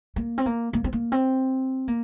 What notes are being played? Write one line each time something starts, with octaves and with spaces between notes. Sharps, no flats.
A#3
C4
A#3
A#3
C4
A#3
C4
A#3